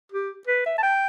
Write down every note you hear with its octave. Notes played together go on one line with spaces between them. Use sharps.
G4
B4
E5
A5
G5